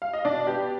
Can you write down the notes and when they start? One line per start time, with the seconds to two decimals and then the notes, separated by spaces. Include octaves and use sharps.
0.02 F5
0.13 D#5
0.25 B2 D4 D5
0.47 B3 G4